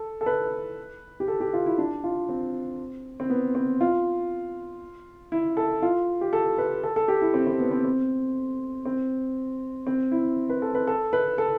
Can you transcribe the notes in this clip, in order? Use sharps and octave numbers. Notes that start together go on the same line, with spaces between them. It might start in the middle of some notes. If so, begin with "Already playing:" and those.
Already playing: A4
A4
B4
G4
A4
G4
F4
E4
D4
F4
C4
C4
B3
C4
F4
E4
A4
F4
G4
A4
B4
A4
A4
G4
E4
C4
C4
B3
C4
C4
C4
C4
E4
B4
A4
B4
A4
B4
A4